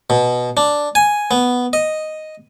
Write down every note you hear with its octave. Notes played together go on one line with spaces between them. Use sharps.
B2
D4
G#5
B3
D#5